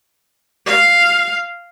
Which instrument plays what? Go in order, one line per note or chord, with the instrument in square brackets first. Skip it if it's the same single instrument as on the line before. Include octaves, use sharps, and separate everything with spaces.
[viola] F5